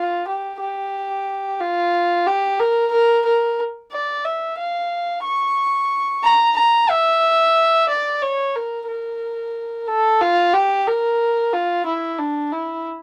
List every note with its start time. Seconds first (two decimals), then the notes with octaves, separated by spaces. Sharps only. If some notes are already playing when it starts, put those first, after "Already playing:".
Already playing: F4
0.27 G4
0.61 G4
1.60 F4
2.27 G4
2.59 A#4
2.92 A#4
3.26 A#4
3.92 D5
4.25 E5
4.58 F5
5.24 C#6
6.23 A#5
6.56 A#5
6.90 E5
7.89 D5
8.22 C#5
8.56 A#4
8.88 A#4
9.87 A4
10.21 F4
10.54 G4
10.87 A#4
11.54 F4
11.86 E4
12.19 D4
12.52 E4